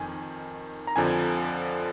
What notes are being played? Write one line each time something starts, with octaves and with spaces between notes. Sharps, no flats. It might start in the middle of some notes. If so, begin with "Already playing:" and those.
Already playing: F2 D#3 G#5
A#5
F2 D3 F3 G#5